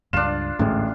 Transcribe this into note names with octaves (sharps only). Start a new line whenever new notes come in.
C#2 G2 D4 F4 E7
A1 D2 G#2 G#3